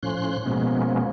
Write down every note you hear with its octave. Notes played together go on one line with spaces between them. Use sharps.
A2 F3 C#4 C6 F#6
B2 F3 G#3 A#3 B3 C#4